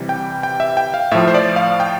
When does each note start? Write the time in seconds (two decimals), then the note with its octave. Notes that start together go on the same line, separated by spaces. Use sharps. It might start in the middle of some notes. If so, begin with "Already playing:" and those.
Already playing: C3 E3 G3
0.09 G5
0.43 G5
0.60 E5
0.77 G5
0.94 F5
1.12 A2 F3 E5
1.28 C5
1.34 D5
1.56 F5
1.80 G5